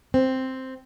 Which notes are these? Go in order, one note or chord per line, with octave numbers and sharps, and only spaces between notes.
C4